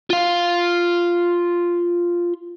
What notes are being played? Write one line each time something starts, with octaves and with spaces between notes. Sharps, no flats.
F4 F5